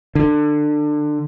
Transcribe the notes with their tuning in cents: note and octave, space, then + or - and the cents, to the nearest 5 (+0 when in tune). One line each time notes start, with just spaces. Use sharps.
D3 +20